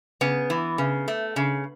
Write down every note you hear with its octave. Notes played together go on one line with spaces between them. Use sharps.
C#3 B3
E3
C#3
A3
C#3